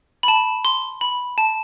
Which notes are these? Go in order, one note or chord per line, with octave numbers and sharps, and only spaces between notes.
B5
A5
C6
B5
A5